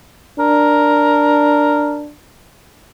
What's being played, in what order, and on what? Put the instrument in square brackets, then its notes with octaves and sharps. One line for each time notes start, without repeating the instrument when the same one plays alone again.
[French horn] D4 [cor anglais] A#4